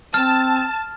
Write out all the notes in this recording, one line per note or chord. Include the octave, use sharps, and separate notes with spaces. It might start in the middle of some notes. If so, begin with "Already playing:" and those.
C4 A5 F6